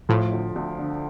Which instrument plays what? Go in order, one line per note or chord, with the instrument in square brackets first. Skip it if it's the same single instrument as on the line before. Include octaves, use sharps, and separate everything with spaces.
[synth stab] A2 [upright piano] F3
[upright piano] D2
D2
D3